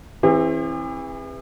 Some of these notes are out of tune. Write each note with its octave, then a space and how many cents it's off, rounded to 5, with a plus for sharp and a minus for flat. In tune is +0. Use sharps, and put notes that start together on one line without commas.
E3 +0 C4 +35 G#4 -45